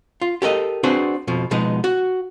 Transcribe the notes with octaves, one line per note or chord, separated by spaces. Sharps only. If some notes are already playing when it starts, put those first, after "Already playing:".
F4
G4 A4 A#4 D#5
C4 D4 F#4 G#4 B4 C5
F2 B2 F3
B2 F3 G#3 B3 D#4
F#4